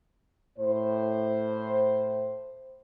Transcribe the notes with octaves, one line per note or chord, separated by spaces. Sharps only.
A2 C5